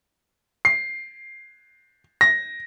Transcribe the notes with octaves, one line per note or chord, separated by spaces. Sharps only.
C7
A#6